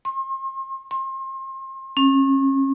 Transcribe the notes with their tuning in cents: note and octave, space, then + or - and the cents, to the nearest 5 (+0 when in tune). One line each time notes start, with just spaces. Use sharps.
C6 +40
C6 +35
C#4 -35